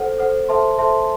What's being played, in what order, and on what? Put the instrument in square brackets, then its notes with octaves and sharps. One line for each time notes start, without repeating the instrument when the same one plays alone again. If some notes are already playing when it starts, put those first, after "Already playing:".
Already playing: [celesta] A4 C5 F#5
A4 C5 F#5
A4 C5 E5 A5 C6
A4 C5 E5 A5 C6